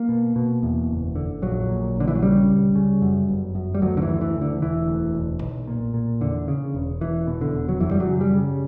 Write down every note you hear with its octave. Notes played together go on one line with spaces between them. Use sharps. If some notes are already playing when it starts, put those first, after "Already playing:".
Already playing: A#3
B2
B2
E2
F#1
D3
A#1 F#3
A#2
A#1 D3
E3
F#3
C#3 G3
C#2
C#3
F#2
G1
F#2
G3
D2 F#3
D3
E3
D2
E3
D2
D3
E1 E3
D2
E1
B1
A#2
A#2
E2 D3
C#3
E1
E1 E3
B2
D3
E1
F#3
F#2 E3
G3
F#3
C#3
G3
C#3